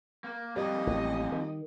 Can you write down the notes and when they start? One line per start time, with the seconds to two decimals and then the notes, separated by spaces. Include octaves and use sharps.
0.24 A#3
0.56 F2 G3 A#3 D#5
0.87 A1
1.32 D#3